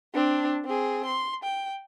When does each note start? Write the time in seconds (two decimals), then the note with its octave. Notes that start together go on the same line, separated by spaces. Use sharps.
0.14 C4 D4
0.65 C4 G#4
1.05 C6
1.43 G5